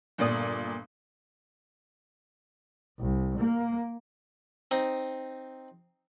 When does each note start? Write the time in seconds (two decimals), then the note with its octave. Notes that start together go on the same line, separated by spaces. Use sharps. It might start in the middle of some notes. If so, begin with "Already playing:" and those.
0.18 G1 A#2 D5 D#6
3.00 C2
3.38 A#3
4.71 C4 D#4